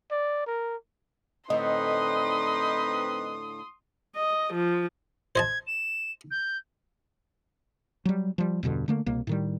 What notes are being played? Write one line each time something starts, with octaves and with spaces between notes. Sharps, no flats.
D5
A#4
A2 D3 C4 D#4 B4 D#5 C6 D#6
D#5
F3
C5 D#5 A5 G#6
E7
G6
F#3 G3
F3 G3
E2 G2 B2 D3
D3 A3 A#3
C2 B2 A#3
A2 D#3 G3